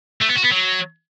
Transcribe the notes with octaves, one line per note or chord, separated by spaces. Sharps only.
A3
B3
F#4
B3
F#3